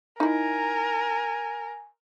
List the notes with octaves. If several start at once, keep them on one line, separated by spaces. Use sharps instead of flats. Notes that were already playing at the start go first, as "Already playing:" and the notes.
D#4 E4 A#4 G#5